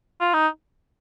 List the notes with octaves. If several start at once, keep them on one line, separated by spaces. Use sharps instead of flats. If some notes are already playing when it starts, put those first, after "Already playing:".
F4
D#4